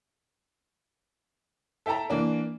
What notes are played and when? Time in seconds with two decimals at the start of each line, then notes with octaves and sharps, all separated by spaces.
1.86 A4 E5 G5 A5 A#5
2.10 E3 A#3 D4